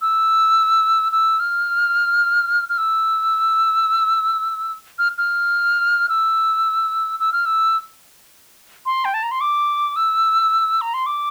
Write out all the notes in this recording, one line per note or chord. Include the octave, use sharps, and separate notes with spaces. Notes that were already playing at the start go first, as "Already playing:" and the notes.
E6
E6
F6
F6
E6
F6
F6
E6
E6
F6
E6
C6
G5
A5
A#5
C6
D6
E6
A#5
C6
D6